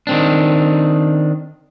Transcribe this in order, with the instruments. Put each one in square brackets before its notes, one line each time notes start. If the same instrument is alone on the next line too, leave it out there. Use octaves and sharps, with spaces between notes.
[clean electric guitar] D#3 C4 D4